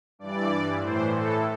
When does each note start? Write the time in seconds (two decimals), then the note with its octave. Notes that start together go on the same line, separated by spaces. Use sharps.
0.19 G2 E3 D5
0.81 A2 E3 C5
1.12 A4